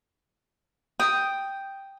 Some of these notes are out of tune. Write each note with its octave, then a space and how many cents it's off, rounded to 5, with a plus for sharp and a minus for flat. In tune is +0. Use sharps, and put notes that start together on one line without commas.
G5 +0 D#6 +0